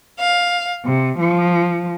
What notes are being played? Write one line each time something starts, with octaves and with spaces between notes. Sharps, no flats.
F5
C3
F3